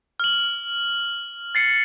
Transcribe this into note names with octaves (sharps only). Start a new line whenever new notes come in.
F6 F#7
A6 C7 C#7